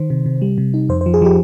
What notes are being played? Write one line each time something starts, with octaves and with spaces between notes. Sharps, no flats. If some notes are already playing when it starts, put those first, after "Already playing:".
Already playing: D#3 C5
C3
C3
G3
C3
D#4
F2 C5
C5
F3
G#4
F3 G4